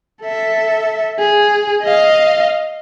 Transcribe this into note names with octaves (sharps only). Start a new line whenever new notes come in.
A4 E5
G#4
D#5 F5